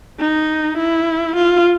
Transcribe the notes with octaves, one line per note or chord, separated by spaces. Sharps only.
D#4
E4
F4